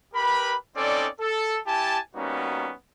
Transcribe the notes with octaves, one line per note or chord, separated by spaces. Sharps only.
G4 A#4 B4 B5
C4 C#4 D#4 A4 D5
A4
E4 G4 G#5 A5
G3 A#3 B3 C#4 D#4 F#4